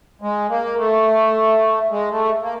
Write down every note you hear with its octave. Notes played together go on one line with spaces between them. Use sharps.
G#3
A#3
A3
G#3
A3
A#3